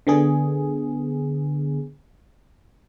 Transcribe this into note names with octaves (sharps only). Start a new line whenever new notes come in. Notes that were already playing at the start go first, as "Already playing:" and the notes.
D3 B3 G#4